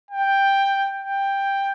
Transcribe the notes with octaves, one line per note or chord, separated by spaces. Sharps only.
G5
G5